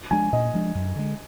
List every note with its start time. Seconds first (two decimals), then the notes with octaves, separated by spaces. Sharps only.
0.11 F3 G#3 D4 G#5
0.32 A#2 D#5
0.54 F3 G#3 D4
0.75 F#2
0.95 D3 G#3